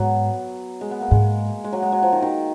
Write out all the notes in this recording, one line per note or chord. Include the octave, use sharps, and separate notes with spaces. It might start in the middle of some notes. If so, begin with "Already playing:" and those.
Already playing: G#2 F#3 B3
G#3
B3
A#3
G#2 G#3
G#3
F#3
G#3
F#3
F3
D#3
D#3